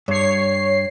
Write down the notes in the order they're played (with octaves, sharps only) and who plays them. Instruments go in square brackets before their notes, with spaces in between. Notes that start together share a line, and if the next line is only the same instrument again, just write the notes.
[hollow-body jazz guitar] G2 [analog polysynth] C#5 C7